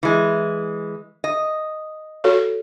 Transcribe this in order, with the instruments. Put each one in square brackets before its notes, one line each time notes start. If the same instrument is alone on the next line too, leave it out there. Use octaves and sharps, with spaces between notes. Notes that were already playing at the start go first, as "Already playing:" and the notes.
[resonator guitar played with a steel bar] E3 G#3
D#5
[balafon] F#4 A4 C#5